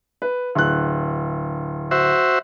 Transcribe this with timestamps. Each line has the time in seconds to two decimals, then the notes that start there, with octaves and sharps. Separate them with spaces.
0.22 B4
0.55 D1 F#6
1.91 F#4 C5 E5